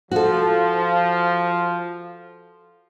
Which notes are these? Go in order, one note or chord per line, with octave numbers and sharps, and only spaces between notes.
F3 F#4 A4